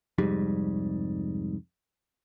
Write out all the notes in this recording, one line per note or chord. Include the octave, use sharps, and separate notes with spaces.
C2 F2 G#2 G3